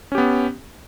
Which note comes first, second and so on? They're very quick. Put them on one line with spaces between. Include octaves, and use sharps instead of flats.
C#4 G4 B3